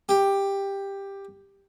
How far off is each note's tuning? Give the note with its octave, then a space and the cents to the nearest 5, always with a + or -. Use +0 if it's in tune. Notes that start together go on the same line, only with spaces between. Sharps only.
G4 +10